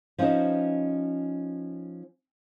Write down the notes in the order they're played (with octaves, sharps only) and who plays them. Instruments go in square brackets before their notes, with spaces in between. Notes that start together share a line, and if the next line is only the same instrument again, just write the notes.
[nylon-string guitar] F3 C#4 D#4 C5 D#5